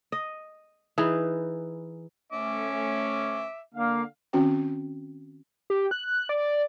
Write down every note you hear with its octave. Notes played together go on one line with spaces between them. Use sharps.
D#5
E3 D#4 G#4 B4
A3 C#4 E5 D6
D3 A#3 F5
D#3 C4 C#4 F#4 G5
G4
F#6
D5